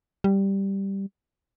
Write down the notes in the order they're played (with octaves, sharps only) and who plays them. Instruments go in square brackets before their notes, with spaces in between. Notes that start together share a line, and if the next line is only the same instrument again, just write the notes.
[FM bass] G3